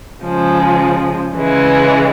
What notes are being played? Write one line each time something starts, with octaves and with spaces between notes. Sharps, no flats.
C#3 F3 G#3
C#3 E3 G#3